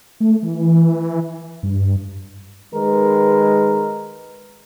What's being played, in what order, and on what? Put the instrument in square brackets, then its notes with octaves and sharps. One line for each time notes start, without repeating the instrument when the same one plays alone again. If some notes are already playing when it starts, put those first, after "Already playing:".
[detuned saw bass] A3
E3
G2
[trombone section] D#3 G#3 A#4 B4